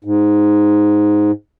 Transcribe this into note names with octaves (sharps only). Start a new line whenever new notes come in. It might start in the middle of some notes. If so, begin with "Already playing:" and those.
G#2